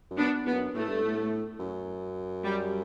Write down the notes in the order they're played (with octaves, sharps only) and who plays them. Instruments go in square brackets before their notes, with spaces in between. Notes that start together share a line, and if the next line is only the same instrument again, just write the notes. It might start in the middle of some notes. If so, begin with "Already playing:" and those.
[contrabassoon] F#2
[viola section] B3 D4
[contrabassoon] E2 [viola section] B3
[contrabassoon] F#2
[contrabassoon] A2 [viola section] A3
[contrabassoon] G2
A2
F#2
[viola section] G3